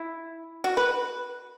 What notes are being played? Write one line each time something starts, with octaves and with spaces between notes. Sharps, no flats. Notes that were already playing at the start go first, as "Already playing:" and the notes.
Already playing: E4
F#4
B4